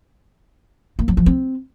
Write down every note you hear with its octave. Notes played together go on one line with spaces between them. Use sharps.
A#3
F#3
F3
C4